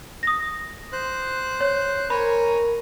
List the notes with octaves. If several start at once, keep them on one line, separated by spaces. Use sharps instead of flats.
D#6 A#6
C5 F#6
C#5
A#4 C#5 G#5 A#5 B5